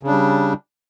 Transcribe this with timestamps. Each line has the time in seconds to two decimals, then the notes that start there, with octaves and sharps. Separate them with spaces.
0.03 C#3
0.07 D4
0.11 G3